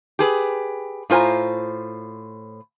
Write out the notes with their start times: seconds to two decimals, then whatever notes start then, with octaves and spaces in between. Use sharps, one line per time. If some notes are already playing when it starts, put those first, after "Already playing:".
0.19 G4 G#4 B4
1.10 A2 F4 C5 G#5 A#5